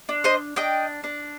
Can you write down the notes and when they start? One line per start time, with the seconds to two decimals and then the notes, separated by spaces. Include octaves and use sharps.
0.09 D4
0.24 C5 D#5
0.56 D4 D#5 G5
1.04 D4